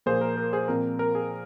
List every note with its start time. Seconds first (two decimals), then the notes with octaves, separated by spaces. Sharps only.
0.06 A#2 F3 A#3 G#4 C5
0.21 A#4
0.37 A#4
0.53 G#4 C5
0.68 A#2 F3 C4 A#4
0.99 A#4
1.15 G#4